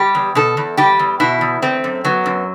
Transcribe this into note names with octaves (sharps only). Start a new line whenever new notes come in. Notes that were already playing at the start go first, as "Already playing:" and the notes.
Already playing: G3 G4
E2
B2 A4
E2
G3 G4
E2
B2 E4
E2
A3 C4
F#2
F#3 B3
F#2